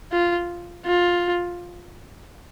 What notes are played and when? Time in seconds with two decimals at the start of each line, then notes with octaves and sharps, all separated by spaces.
0.11 F4
0.86 F4